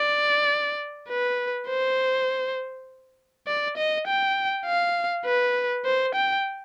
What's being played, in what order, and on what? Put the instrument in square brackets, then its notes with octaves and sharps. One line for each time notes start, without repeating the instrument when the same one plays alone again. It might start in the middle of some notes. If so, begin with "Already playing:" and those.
Already playing: [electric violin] D5
B4
C5
D5
D#5
G5
F5
B4
C5
G5